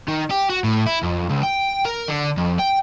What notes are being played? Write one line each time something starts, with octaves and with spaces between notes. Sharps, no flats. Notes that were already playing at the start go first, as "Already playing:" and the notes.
D#3
G4
F#4
A2
E4
F2
C#2
G5
A#4
D3
F2
G5